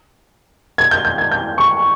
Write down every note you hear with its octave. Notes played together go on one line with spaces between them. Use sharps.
G#6
G6
G6
G#6
G6
C#6